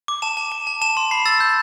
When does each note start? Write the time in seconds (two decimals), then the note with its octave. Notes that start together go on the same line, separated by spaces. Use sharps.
0.08 D6
0.22 A5 E7
0.37 A5
0.52 A5
0.67 A5
0.82 A5 E7
0.97 C6
1.11 B5 C7
1.26 E6 A6
1.40 G6